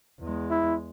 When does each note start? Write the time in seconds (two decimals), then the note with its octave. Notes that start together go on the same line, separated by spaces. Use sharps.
0.20 E2 G#3
0.50 E4